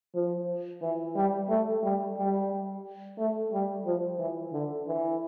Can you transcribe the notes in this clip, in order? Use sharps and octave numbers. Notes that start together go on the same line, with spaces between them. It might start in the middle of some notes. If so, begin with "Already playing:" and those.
F3
E3
G3
A3
G3
G3
A3
G3
F3
E3
D3
E3